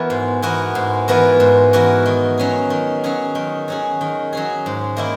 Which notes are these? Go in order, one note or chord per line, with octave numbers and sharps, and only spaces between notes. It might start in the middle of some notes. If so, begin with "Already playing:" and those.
Already playing: E3 B3 F#4 A#4
G#2
E3 B3 F#4 A#4
G#2
E3 B3 F#4 A#4
G#2
E3 B3 F#4 A#4
D#3
F#3 C#4 G#4
D#3
F#3 C#4 G#4
D#3
F#3 C#4 G#4
D#3
F#3 C#4 G#4
G#2
D#3 A#3 E4